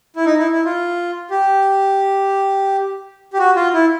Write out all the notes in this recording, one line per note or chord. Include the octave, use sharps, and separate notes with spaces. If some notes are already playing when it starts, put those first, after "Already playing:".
E4
D#4
E4
E4
F4
G4
G4
F#4
F4
E4